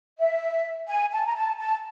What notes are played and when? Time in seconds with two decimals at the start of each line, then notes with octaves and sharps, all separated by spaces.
0.19 E5
0.89 G#5
1.12 A5
1.27 A#5
1.35 A5
1.59 A5